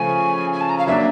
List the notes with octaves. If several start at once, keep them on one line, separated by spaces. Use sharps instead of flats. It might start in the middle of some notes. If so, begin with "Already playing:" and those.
Already playing: C#3 F3 A3 C#4 G#5
G#5
A5
A#5
F5
F#3 A#3 D4 E5